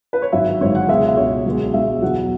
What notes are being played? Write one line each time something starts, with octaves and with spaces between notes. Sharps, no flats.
B4
C#5
G#1 G#2 F#3 E5
G#1 G#2 F#3 C#5
F#5
C#2 B2 G#3 E5
E5
C#2 B2 G#3 C#5
B1 B2 G#3
B1 B2 G#3 E5
E2 B2 F#3 F#5